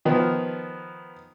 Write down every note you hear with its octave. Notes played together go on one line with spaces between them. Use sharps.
D#3 F3 B3